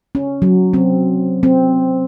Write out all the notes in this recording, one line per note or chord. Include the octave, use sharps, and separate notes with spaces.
C#4
F#3
C4
C4